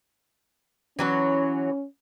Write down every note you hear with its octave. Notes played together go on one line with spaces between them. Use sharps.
E3 F#3 C#4 C#5